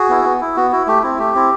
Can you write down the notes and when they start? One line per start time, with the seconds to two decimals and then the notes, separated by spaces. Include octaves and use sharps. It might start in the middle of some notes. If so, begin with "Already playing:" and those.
Already playing: F#4 G#4
0.09 B3 E4
0.25 B3
0.41 E4
0.56 B3 F#4
0.72 E4 F#4
0.87 A3 G4
1.03 C4 E4
1.18 A3 G4
1.35 C4 E4